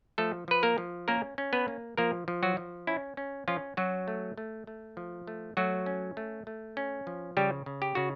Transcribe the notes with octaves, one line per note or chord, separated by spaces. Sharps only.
F3 A3 A4
F3 B4
A#3 A#4
F3
A#3 C#4 A#4
C#4
B3 B4
A#3
F3 A#3 A#4
F3
F#3 F#4
F3
C#4 E4
C#4
F3 C#4 F4
F#3 C#4 F#4
A3
A3
A3
F3
A3
F#3 A3 F#4
C#4
A3
A3
C#4
F3
C#3 G3 G4
C#3
G4
C#3 F#4